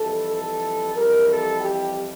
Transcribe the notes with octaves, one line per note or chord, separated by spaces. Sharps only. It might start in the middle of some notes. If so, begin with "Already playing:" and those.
Already playing: F2 E3 G3 A4
A4
F2 E3 G3 A#4
A4
G4